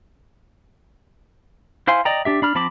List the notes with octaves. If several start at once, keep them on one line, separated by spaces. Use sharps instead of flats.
E4 C5 F5 G#5 C6
D5 D#5 G5 A#5
D4 G4 E5
D4 B5 F6
F3 C4 A5 B5 D6